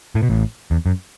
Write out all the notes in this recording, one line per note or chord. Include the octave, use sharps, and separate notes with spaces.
A2
B2
A1 A2
E2
F#2